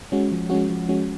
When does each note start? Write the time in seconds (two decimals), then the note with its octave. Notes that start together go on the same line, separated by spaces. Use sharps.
0.12 G#3 C#4 F#4
0.32 F3
0.50 G#3 C#4 F#4
0.70 F3
0.89 G#3 C#4 F#4